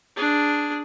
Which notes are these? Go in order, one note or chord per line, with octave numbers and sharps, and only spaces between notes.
D4 G#4